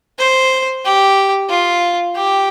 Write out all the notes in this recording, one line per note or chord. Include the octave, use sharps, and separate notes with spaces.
C5
G4
F4
G4